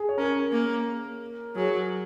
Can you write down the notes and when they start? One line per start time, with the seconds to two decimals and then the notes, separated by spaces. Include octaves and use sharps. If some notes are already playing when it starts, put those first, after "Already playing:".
Already playing: G#4
0.09 C#5
0.18 C#4 A#4
0.52 A#3
1.56 F#3 G#4